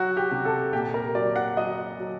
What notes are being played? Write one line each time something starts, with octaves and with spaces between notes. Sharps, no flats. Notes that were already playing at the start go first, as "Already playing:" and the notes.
Already playing: F#3 F#4
G4
C3
A4
A#2 G4
A#4
F#3 D5
F#5
F#3 D#5
F#3